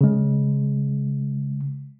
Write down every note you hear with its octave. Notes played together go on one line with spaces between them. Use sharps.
C#3 G#3